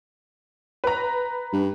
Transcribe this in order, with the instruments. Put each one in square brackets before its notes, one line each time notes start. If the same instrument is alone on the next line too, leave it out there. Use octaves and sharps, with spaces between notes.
[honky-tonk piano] B4 A#5
[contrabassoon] G2